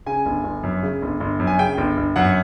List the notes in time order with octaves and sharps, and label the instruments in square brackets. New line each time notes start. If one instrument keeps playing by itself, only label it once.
[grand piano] C#3 G#5
G1
G1
F#2
C#3
G1
G1
F#2
G#5
C#3 G5
G1
G1
F#2 F#5